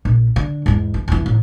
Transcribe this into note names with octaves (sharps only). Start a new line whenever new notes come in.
A#1
D3
E2 G#2
E3
F2 E3
A1